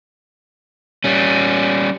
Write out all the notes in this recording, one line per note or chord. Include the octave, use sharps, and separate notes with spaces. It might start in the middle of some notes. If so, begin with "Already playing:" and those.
G3 C#4